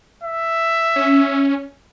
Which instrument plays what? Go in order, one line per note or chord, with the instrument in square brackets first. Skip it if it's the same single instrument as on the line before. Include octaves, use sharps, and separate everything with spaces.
[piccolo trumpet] E5
[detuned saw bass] C#4